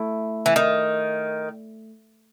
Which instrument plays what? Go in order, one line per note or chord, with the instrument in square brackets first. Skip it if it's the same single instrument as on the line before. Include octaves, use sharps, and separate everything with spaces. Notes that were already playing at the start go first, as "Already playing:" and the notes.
Already playing: [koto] A3 E4
[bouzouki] E3
D#3